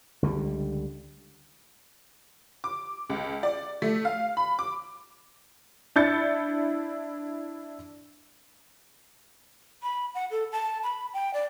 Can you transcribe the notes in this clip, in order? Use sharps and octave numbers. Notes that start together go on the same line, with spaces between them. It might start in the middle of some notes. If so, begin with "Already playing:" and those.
C#2 D3 G3
D6
C#2
D5
A3
F5
B5
D6
D4 E4 G6 A6 C#7
B5
F#5
A4
A5
B5
G5
D5